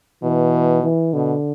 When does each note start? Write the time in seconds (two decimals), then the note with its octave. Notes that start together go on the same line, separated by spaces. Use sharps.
0.23 B2 E3
0.83 E3
1.13 B2 D3